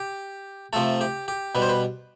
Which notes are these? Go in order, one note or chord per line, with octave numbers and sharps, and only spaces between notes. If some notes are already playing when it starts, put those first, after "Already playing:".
Already playing: G4
C3 F3 A3 A4
G4
G4
B2 G3 B4
C5
B4